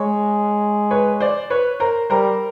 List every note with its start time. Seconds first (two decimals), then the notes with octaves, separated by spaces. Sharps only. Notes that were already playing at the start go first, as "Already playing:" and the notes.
Already playing: G#3 C#5
0.91 B4 C#5
1.20 C5 D5
1.50 B4 C#5
1.80 A#4 C5
2.10 G3 A#4 C5